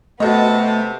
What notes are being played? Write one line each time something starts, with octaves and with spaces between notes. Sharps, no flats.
C3 A3 B3 F#4 A4 D#5 A5